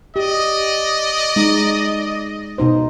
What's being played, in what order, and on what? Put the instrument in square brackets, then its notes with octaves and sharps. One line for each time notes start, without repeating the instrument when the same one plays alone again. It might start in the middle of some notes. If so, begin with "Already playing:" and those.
[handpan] G4 [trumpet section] D5 D#5
[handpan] G#3 D#4
B2 D#4 C5